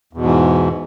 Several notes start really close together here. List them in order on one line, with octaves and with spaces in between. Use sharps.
E2 B2 G#2 E3